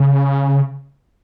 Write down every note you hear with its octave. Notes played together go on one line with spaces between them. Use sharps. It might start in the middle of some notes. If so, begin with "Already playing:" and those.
Already playing: C#3